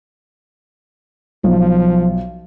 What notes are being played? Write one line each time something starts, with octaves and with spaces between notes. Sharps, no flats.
B1 F3